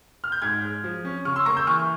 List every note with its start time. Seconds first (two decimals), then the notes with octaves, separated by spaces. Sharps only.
0.24 F6
0.32 G6
0.42 G#2 F6 G#6
0.62 G#3
0.84 F3
1.05 C#4
1.25 C#3 C#6 F6
1.36 C6 E6
1.46 A#3 A#5 C#6
1.57 E6 G6
1.67 E3 C#6 F6